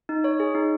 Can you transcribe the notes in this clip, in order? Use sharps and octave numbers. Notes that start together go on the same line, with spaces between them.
D#4
C#5
G#4
D#4